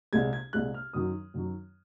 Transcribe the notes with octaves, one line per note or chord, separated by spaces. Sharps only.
C2 A#2 G#3 G#6
G#6
C2 A#2 G#3 F#6
F6
F#2 D#3 F#3 D#6
F#2 D#3 F#3